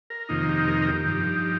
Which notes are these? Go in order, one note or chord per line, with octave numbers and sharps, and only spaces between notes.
A#4
F2 C3 D#3 A#3 D#4 F4
G4
A#4
A#4
G4
G2 F3 D#4